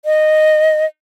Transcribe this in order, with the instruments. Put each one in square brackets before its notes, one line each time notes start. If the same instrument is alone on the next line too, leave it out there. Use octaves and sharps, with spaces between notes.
[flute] D#5